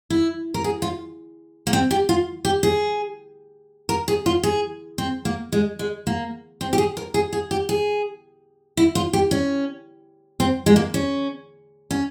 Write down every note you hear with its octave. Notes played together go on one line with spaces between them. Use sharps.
E4
A#4
G#4
F4
A#3
C4
G4
F4
G4
G#4
A#4
G#4
F4
G#4
C4
A#3
G#3
G#3
A#3
C4
G4
G#4
A#4
G#4
G#4
G4
G#4
E4
F4
G4
C#4
C4
G#3
A#3
C#4
C#4